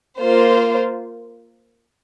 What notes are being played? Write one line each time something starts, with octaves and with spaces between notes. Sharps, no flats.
A#3 F4 C5